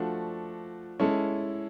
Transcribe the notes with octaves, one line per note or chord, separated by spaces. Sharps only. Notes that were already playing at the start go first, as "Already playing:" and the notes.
Already playing: F3 A3 D4 F#4
G#3 C#4 E4 A4